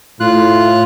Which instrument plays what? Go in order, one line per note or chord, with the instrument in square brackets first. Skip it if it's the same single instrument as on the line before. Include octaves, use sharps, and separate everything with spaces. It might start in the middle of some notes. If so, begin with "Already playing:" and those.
[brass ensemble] A2 [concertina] F4 F#6